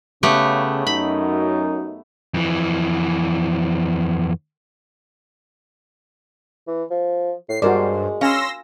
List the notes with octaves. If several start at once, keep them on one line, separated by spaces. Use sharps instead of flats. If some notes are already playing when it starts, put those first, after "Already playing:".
C#3 A3 B3 G4
F#2 D#4 B5
F2 E3
E3
F3
A2 C7
G2 G#3 F#4 A#4 C5 D5
C#4 F5 G#5 B5 C6 E6 A#6